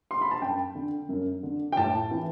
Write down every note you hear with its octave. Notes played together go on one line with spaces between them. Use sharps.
C6
B5
A5
F#2 G5
D3
F#2
D3
G5
A2 A5
E3